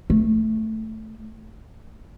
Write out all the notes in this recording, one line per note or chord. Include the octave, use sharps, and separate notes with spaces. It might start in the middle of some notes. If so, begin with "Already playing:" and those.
A3